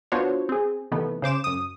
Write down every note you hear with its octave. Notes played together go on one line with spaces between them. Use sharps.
B3 D4 F4 F#4 C5 C#5
C4 G#4
C3 D#3 E3 A3 B3
C#3 C5 D6 E7
F#2 D#6